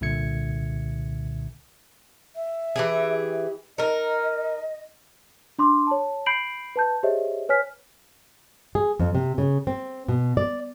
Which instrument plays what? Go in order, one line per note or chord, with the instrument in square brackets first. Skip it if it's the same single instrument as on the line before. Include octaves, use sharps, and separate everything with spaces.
[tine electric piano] C2 A#2 D3 E5 G#6 C#7
[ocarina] E5
[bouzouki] E3 G4 G#4
[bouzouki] D#4 A#4 [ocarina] D#5
[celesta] D4 C6 D6
C#5 A5
B5 G6 C7 D7 F#7
B4 A5 G6
G4 G#4 C5 C#5 D#5 E5
B4 C#5 G#5 F6 B6
[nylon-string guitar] G#4
F2
C3
C#3
C4
B2
D5